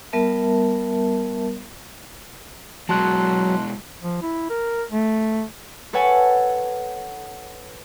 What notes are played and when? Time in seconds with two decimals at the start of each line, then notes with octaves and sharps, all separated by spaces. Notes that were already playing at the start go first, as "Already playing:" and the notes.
0.13 G3 B3 A#4 E5 A5
2.89 B2 F#3 G#3 A5 C6 F#6
4.02 F3
4.22 E4
4.50 A#4
4.91 A3
5.93 A4 B4 C#5 F#5 G#5 A5